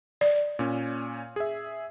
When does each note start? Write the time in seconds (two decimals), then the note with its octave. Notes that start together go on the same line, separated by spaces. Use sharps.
0.21 D5
0.59 A#2 C#4
1.36 G#4 E5